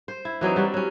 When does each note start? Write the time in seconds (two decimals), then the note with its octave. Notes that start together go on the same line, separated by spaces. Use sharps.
0.08 C5
0.25 E4
0.41 E3 F#3 C4 D#4
0.56 G3 F#4 D5
0.74 F#3 C#4